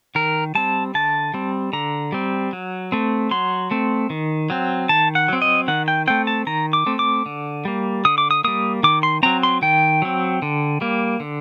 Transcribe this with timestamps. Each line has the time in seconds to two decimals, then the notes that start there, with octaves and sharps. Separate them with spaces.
0.15 D#3 A#4
0.55 G3 C4 A5
0.94 D3 A5
1.34 G3 C4
1.73 D3 A#5
2.12 G3 C4
2.53 F#3
2.92 A3 C4
3.31 F#3 C6
3.71 A3 C4
4.10 D#3
4.50 F#3 C4
4.89 D#3 A5
5.15 F#5
5.28 F#3 C4
5.42 D#5
5.68 D#3 F#5
5.88 G5
6.07 A3 C4 G5
6.27 A5
6.47 D#3 A#5
6.73 D6
6.86 A3 C4
6.99 D6
7.26 D3
7.65 G3 A#3
8.05 D3 D#6
8.18 D6
8.31 D#6
8.44 G3 A#3 D#6
8.83 D#3 D6
9.03 C6
9.23 F#3 C4 A#5
9.43 C6
9.62 D#3 G5
10.02 F#3 C4
10.42 D3
10.81 G3 A#3
11.20 D3